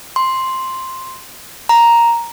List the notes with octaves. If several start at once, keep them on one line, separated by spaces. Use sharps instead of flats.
C6
A#5